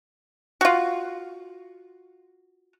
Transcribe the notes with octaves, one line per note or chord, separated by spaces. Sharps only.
F4 F#4